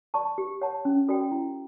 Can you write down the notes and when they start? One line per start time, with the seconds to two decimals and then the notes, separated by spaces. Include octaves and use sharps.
0.14 D5 A5 C#6
0.38 G4
0.61 C#5 F#5 A5
0.85 C#4
1.09 F#4 A4 D5 G5
1.32 E4